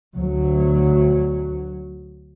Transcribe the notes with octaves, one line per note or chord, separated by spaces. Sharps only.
D2 F#3